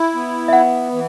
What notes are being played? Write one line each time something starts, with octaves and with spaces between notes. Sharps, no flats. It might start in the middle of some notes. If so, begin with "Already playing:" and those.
Already playing: E4
B3
E5
E3 F#5
E3